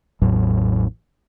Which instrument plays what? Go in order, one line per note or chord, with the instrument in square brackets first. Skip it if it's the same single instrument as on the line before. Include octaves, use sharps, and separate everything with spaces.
[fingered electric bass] A1 E2 A2 F#3